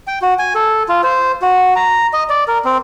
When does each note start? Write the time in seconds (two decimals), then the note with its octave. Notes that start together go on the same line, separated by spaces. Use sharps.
0.07 G5
0.22 F#4
0.39 G#5
0.55 A4
0.89 F4
1.03 C5
1.42 F#4
1.76 A#5
2.13 D#5
2.29 D5
2.48 A#4
2.65 C4